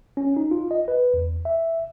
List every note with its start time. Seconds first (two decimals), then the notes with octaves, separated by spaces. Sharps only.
0.17 C#4
0.37 D#4
0.51 F4
0.71 D#5
0.88 B4
1.14 E2
1.45 E5